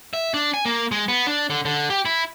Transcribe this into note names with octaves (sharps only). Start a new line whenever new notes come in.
E5
D4
G#5
A#3
G#3
B3
D4
D3
D3
G4
E4